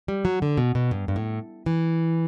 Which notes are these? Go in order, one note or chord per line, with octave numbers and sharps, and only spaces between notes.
G3
F#3
D3
B2
B2
G2
G2
A2
E3